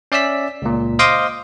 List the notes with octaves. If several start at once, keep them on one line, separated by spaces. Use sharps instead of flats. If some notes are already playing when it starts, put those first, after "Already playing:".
C#4 D5 E5 E6 B6
C#2 A#2
C5 D#5 F5 C6 D6 D#6